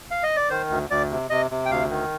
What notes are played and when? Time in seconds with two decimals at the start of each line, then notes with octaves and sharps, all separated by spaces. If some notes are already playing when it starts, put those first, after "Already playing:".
0.11 F5
0.23 D#5
0.36 D5
0.50 D#3 C5
0.70 D2
0.90 D2 D5
1.10 C3
1.30 C3 D#5
1.51 C3
1.66 G5
1.70 D2 F5
1.91 D#3